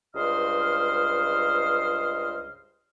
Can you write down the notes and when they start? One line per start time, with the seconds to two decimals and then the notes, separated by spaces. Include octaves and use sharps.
0.15 C#2 G2 C5 D#5 F6